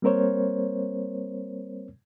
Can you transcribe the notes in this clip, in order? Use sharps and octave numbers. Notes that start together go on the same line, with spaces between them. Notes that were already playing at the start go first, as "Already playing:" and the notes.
G3 A#3 C4 A#4 C5 C#5